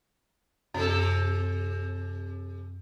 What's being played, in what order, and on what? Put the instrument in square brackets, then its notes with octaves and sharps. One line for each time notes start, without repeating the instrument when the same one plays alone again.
[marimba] F#2 [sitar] C3 A4